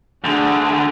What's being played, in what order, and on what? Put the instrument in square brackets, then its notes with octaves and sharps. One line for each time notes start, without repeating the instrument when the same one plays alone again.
[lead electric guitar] D2 D3 [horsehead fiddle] D4 G#4